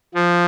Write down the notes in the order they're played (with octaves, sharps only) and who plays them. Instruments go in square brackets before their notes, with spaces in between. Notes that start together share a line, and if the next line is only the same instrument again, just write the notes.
[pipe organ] F3